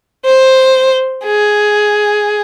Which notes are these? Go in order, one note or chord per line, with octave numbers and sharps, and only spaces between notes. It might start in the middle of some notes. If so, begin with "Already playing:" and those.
C5
G#4